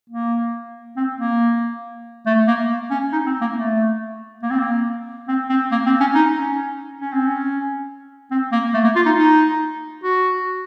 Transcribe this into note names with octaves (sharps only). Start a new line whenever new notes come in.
A#3
C4
A#3
A3
A#3
C#4
D#4
C4
A#3
A3
A#3
C4
A#3
C4
C4
A#3
C4
C#4
D#4
C#4
C#4
C4
C#4
C4
A#3
A3
A#3
F4
D#4
D#4
F#4